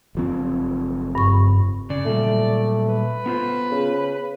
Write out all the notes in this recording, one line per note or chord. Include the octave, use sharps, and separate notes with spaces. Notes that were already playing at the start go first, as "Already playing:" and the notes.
F#1 F3 C4
G2 C#6
C#3 D5
A#2 F#3 G3 A3
B4
B3 F4 C5
C#3